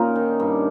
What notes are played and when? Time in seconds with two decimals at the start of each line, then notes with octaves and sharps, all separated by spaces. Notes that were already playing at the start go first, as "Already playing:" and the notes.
Already playing: A#2 C#4 D#4 A#4
0.16 D#3
0.40 G2